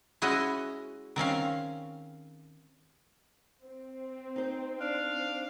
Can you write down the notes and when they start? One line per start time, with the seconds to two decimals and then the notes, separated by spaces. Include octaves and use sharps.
0.22 G#3 C#4 E4 F#4 D#5
1.16 D#3 C4 C#4 F5
3.66 C4
4.36 D#4 C5
4.81 D4 F5